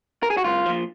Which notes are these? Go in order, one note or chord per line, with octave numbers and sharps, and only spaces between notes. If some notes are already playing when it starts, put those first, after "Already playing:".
A#4
G#4
F#4
C2 F4
A#2 F3